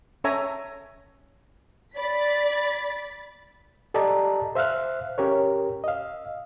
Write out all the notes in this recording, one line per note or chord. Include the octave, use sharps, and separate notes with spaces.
C#4 A4 C#5 E5 G#5 A#5
D5 B5 A6 B6
G4 A4 D5 D#5 A5 A#5
C5 E5 F5 F6 F#6
C#4 G4 A#4 C#5
D#5 F5